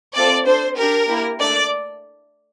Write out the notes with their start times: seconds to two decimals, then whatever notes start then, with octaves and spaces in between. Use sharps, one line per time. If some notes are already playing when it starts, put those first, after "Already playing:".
0.16 A3 C4 F4 A4 D5
0.46 D4 A4 C5
0.78 D4 G4 A#4
1.09 A#3 E4 G4
1.39 A3 D4 A4 D5